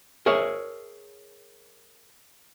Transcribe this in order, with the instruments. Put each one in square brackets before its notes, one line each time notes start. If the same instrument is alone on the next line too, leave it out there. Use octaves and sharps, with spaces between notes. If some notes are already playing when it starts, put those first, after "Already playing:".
[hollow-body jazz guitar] G#4 A#4 C#5 E5